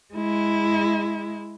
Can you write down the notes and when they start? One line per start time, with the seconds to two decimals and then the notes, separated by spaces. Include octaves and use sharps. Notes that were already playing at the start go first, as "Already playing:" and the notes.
0.14 G#3 E4